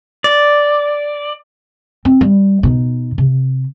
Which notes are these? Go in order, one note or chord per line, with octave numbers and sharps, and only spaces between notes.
D5
C4
G3
B2 D#4
C3